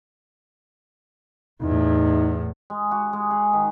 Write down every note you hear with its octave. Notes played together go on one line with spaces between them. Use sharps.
E2 A2 D#4
G#3
F#4
G#3
G#4
D#3